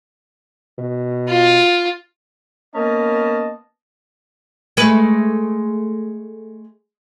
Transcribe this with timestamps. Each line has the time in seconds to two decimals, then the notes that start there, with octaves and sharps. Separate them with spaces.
0.78 B2
1.29 F4
2.75 A#3 B3 C#4 D#5 A5
4.77 G#3 A3 B4